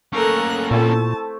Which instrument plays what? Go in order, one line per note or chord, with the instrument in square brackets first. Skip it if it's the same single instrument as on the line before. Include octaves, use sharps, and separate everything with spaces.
[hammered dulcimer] A3 [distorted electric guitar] A#3 C#4 [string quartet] A4 A#4 F#6
[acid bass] A#2 [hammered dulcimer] A3 C4 E4 [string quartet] A5